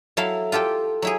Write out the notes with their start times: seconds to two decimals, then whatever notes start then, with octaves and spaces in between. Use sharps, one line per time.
0.17 F#3 E4 A4 F5
0.52 F4 G4 A4 G5
1.02 F#3 E4 G#4